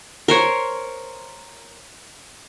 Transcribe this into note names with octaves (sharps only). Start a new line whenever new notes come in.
A#4 C5 C#5